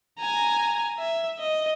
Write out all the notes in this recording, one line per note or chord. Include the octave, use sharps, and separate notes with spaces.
G#5 A#5
E5
D#5